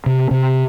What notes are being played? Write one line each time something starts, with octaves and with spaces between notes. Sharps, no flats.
C3
C3